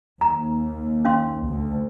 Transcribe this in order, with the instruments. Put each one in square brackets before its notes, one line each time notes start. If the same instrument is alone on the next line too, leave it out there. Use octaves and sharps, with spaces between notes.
[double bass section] D#2 [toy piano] A#5
[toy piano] C#4 F5 C6
[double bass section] D2